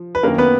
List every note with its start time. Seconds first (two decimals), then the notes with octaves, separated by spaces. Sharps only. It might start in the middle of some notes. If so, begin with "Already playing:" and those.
Already playing: F3
0.15 B4
0.23 F#2 D#3 A#3 A#4
0.38 B3 B4